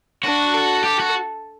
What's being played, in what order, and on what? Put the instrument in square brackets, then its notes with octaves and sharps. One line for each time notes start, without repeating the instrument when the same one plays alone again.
[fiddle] D4 [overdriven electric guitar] F#4
[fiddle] A4
[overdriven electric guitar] G4
F#4